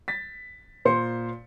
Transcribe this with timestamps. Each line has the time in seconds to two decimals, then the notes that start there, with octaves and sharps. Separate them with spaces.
0.08 A6 B6
0.85 A#2 C5 C6 C#7